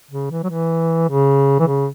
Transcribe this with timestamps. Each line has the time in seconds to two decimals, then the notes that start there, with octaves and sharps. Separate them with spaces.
0.10 C#3
0.31 E3
0.43 F#3
0.49 E3
1.09 C#3
1.59 E3
1.67 C#3